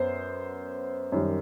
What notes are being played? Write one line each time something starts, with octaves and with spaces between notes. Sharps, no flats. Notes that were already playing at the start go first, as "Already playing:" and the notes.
Already playing: F#2 B3 C5
F#2 D#3 G3